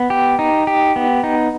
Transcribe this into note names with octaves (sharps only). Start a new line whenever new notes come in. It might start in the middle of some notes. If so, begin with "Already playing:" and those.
Already playing: B3
G4
D#4
G4
B3
D#4